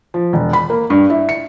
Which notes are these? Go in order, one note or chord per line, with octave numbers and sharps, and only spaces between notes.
F3
E1
B5
A#3
G2
E4
C#7